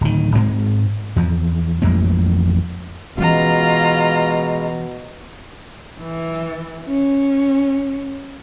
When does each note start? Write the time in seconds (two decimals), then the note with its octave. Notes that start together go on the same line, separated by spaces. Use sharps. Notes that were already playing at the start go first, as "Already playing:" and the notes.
0.01 D1 D#3
0.35 G#2 G#3 C4
1.16 E2 F3
1.82 A1 F2 G#3 A#3
3.18 B2 E3 G#3 C#4 F4 A#5
6.00 E3
6.88 C#4